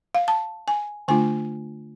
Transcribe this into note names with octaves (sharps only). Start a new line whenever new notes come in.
F5
A5
G#5
D3 A3 D4 F4 G#5